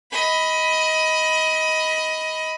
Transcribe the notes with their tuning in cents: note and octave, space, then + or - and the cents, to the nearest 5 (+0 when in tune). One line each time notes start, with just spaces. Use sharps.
D#5 +20 B5 +0